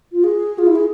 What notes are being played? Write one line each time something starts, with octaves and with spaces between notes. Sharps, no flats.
F4
G#4
F4
E4
G#4